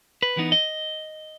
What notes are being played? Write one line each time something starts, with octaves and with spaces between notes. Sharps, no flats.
B4
E3 B3 D#4
D#5